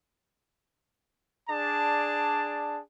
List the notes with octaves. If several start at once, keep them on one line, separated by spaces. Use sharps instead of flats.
D4 G#4 D5 A5